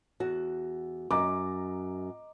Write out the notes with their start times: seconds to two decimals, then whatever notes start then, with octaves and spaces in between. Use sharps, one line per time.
0.20 E2 F#4 F#5
1.11 F#2 D#5 A#5 D6